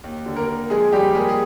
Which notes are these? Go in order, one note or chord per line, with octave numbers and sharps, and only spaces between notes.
D#2
D3
A#3 A#4
A#3
F3 G#3 G#4
D#2 G3 G4
G#3 A#3 G#4
G#4